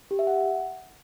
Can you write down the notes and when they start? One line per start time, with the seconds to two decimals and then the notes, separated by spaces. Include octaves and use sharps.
0.11 G4
0.19 E5
0.27 F#5